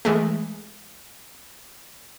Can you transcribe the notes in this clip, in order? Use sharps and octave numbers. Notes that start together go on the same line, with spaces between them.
E3 G#3 A3